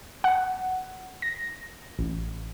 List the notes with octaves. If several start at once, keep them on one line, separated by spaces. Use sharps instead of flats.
F#5
A#6
A1